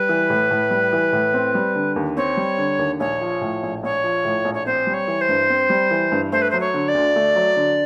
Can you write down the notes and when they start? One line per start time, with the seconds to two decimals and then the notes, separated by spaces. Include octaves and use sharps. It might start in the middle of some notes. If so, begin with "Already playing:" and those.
Already playing: G3 B4
0.09 E3
0.30 A2
0.51 A2
0.71 G3
0.93 E3
1.13 A2
1.34 C4
1.55 G3
1.75 D3
1.96 D#2
2.17 C4 C#5
2.37 G3
2.58 D3
2.79 D#2
3.00 A#1 C#5
3.21 F3
3.41 A2
3.63 A#1
3.83 A#1 C#5
4.04 F3
4.25 A2
4.45 A#1
4.54 C#5
4.66 C4 C5
4.87 G3
4.94 C#5
5.08 E3
5.21 C5
5.29 G2
5.50 C4
5.70 G3
5.91 E3
6.12 G2
6.32 A3 C5
6.42 B4
6.50 F#3 C5
6.60 C#5
6.74 D3
6.88 D5
6.95 D2
7.16 A3
7.36 F#3
7.56 D3